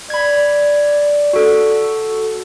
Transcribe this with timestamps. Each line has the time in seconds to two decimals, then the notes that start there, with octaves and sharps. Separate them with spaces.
0.10 D5 B5 G#6
1.33 F#4 A4